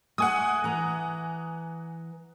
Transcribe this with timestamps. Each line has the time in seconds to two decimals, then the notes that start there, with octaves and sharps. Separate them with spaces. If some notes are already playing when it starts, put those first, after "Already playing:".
0.18 A3 F#5 G#5 D#6
0.64 E3 A#5